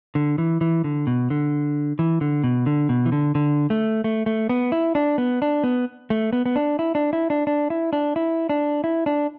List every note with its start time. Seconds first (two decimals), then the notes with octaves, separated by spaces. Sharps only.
0.15 D3
0.38 E3
0.61 E3
0.84 D3
1.07 B2
1.30 D3
1.99 E3
2.21 D3
2.44 B2
2.66 D3
2.89 B2
3.06 E3
3.12 D3
3.35 D3
3.70 A3
4.04 A3
4.26 A3
4.49 B3
4.72 E4
4.95 D4
5.18 B3
5.42 D4
5.64 B3
6.10 A3
6.33 B3
6.46 B3
6.56 D4
6.79 E4
6.95 D4
7.13 E4
7.30 D4
7.47 D4
7.70 E4
7.93 D4
8.16 E4
8.49 D4
8.84 E4
9.06 D4